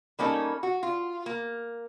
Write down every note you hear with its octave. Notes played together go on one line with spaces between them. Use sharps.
G3 A#3 C#4 D#4 A4
F#4
F4
A#3